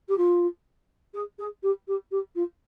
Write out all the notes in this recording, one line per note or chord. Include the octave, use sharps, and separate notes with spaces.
G4
F4
G#4
G#4
G4
G4
G4
F4